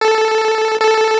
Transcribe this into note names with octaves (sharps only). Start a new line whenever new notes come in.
A4
A4